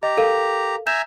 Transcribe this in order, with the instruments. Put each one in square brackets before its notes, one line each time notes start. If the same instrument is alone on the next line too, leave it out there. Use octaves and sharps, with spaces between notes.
[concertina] G4 A#5 [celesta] D#5
[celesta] A4 A#4 F5
[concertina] E5 G#5 A#5 [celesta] G6 E7